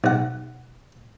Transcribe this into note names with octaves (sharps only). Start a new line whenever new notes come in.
B1 F#5